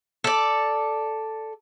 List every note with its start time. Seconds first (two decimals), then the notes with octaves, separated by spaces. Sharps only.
0.24 A4 D5